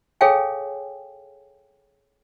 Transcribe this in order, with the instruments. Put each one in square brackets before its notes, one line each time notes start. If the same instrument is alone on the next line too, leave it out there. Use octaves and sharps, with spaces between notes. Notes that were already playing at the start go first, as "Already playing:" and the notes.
[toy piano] G#4 A4 C#5 F5 G5 G#5